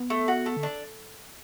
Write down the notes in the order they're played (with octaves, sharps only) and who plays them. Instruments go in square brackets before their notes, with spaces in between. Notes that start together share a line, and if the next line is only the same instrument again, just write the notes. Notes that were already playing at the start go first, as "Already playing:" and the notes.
Already playing: [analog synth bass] B3
[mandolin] A3
F#4
A3
[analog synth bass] D3
[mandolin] D4